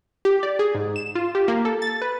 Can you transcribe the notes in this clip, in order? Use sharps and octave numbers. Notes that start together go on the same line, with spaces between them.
G4
D5
G#4
G#2
E7
F4
G4
A#3
A4
A6
B4